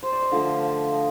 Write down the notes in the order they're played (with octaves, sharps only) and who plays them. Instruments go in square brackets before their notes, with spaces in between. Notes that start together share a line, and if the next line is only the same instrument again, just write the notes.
[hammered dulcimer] C5
D5
D#5
D3 F3 A3 F5
F5
D#5